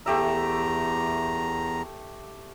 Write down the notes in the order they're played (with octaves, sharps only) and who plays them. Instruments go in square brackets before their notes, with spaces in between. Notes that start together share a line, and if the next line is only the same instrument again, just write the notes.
[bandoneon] E2 A#5 [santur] A3 G4 E5